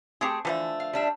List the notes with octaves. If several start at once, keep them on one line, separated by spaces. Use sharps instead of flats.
A3 C4 G4 G#4
D3 E3 F3 A3
F5
G3 D4 E5